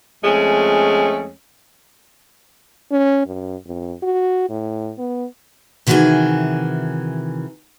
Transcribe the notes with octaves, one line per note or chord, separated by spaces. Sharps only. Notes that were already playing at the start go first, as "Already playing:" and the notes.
F2 G#3 A3 C#4
C#4
F#2
F2
F#4
A2
B3
C3 D#3 E3 F#4 G#4 G#5